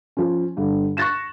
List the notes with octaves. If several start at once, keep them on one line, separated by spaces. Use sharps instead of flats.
F3 C#4
G2 D3
C#6 F#6 A6 A#6 E7